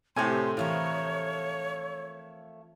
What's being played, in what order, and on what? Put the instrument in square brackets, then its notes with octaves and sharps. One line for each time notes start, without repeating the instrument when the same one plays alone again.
[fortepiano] A2 C3 G#5 [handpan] C4 A4 [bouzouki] C#4 G4 [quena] C6
[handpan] E3 E4 [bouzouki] F3 A3 A#4 [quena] C#5